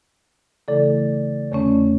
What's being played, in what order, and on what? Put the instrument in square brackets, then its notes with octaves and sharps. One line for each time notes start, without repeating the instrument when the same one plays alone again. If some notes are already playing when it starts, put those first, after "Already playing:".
[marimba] C#3 E3 A3 E4 A4 [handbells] D5
[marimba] E2 D3 A3 C#4 [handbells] C#5